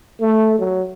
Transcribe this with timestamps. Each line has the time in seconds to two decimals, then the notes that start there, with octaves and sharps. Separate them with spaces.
0.21 A3
0.59 F#3